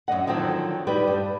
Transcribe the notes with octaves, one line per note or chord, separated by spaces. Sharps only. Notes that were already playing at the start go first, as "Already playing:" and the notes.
F#2 F3 D#5 F#5
D3 D#3 F3 F#3 C4
G3 D#4 G4 B4
G2